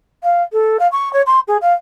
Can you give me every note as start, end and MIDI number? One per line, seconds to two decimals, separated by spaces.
0.23 0.42 77
0.52 0.77 69
0.79 0.88 77
0.92 1.11 85
1.13 1.21 73
1.26 1.39 84
1.47 1.57 68
1.61 1.73 77